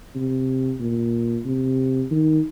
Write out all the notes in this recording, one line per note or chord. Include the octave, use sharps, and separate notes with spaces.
C3
A#2
C3
D#3